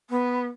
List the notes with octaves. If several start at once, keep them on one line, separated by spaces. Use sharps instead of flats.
B3